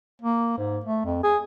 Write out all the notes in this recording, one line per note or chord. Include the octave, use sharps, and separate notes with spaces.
A#3
G#2
A3
F2
G#4